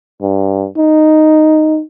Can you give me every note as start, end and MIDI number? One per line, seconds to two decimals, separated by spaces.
0.22 0.66 43
0.78 1.82 63